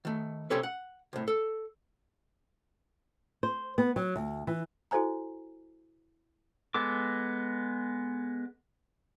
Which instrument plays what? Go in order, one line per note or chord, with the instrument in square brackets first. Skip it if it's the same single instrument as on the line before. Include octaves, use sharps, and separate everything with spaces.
[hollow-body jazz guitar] D#3 A3
C3 C4 C#4 G4 A4 B4
F#5
C2 A2
A4
[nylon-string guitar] C5
B3
F#3
D2
E3
[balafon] E4 F#4 A4 C5 G#5 A#5
[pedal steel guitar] G#3 B3 A4 D6